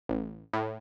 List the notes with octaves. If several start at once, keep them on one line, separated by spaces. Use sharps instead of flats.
A1
A2